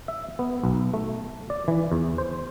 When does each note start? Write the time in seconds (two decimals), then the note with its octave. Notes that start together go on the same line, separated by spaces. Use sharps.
0.08 E5
0.39 B3
0.63 B1
0.94 A3
1.50 D5
1.68 E3
1.92 E2
2.18 C5